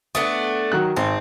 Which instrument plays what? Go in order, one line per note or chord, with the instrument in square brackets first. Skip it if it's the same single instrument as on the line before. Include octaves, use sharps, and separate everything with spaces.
[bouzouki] A3 B3 D4 [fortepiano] D#6
[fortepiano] D#3 F#3 F#6
[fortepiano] G#1 [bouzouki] C4